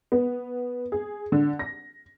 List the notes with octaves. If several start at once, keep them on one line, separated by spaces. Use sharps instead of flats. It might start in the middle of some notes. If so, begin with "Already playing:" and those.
B3
G#4
D3
A#6